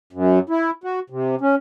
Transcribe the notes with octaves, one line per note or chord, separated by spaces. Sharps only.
F#2
E4
F#4
C3
C#4